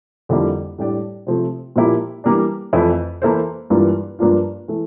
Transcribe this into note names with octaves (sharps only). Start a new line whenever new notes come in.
F2 D3 G3 A#3 E4
A2 G3 D4 G4 D5
C3 F3 A3
A#2 F3 A#3 E4 G4
E3 G3 A#3 D4
F2 E3 A3 E4
E3 A#3 E4 A4 C5
G2 E3 G3 A#3 F4
G2 F3 A#3 D4 F4
E3 A3